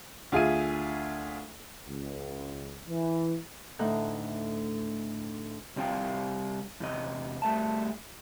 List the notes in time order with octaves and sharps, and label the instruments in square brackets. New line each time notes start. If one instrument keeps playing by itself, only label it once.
[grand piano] D2 F4 G#4 E5 D#7
[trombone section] C#2
E3
[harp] D2 A2 D#4 F#5 F#6 G6
[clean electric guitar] C2 G3 C4 F5 G5
E2 C3 D#5
G3 A3 E5 A5